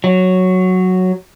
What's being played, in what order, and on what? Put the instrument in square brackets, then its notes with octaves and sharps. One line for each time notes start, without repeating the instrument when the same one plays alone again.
[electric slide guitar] F#3